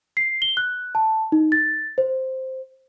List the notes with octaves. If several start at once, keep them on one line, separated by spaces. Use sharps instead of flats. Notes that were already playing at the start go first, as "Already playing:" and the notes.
C7
G7
F#6
A5
D#4
A6
C5